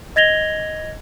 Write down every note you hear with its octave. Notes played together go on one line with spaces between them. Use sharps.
D#5 G#6 A#6 F7 G7